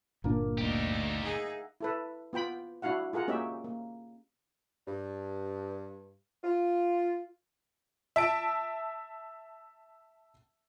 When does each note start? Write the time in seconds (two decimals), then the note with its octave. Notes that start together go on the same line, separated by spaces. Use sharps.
0.24 G1 A#2 A#3 D4
0.58 D2 D#4 G4 A#4
1.24 D#4 G#4 E5 F#5
1.81 E4 A4 B4
2.33 B3 F4 G5 B5
2.82 D4 E4 F#4 F5 F#5
3.13 F4 G#4 A#4 F#5
3.28 A#3 C#4 D#4 G4 E5
3.64 A#3
4.87 G2
6.44 F4
8.16 E5 A5 D7